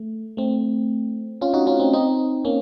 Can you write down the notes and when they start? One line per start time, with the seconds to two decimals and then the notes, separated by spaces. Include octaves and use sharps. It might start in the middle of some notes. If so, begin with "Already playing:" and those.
Already playing: A3
0.37 A3 C4
1.41 C#4 F4
1.54 D#4 F#4
1.67 C#4 F4
1.79 C4 D#4
1.93 C4 D#4
2.45 A#3 C#4